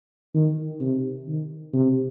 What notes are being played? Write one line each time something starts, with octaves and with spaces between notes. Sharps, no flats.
D#3
C3
D#3
C3